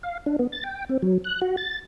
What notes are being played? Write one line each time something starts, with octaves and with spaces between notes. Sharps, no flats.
F5
D4
B3
A6
G5
C4
F#3
F#6
F#4
A6